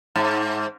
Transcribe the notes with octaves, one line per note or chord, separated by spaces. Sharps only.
G#2